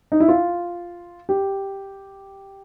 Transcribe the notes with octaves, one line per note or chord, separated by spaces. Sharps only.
D#4
E4
F4
G4